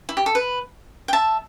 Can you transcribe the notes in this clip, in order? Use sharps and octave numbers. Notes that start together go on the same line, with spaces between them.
E4
G4
A4
B4
G5
E5 A5